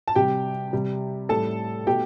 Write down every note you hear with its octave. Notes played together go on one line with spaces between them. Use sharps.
A5
C3 G3 G4 G5
C3 G3
A2 G3 A4 A5
B2 A3 G4 G5